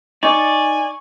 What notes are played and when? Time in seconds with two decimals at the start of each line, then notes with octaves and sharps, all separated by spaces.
0.23 D#4 D5 G#5 C#6